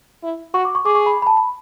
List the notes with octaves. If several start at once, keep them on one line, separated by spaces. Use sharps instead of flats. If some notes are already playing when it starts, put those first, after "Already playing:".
E4
F#4 C#6
D6
C#6
G#4 D6
C#6
B5
B5
A5
B5